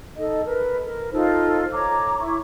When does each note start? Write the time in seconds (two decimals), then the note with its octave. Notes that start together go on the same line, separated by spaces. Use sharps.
0.18 D#4 A4 D#5
0.46 A#4 B4
0.83 A#4
1.12 D#4 F4 A4 C5
1.72 C#5 A#5 D6
2.19 E4 C#6